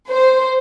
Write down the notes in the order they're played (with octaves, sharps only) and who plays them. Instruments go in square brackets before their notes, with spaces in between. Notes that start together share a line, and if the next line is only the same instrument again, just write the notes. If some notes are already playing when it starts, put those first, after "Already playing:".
[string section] C5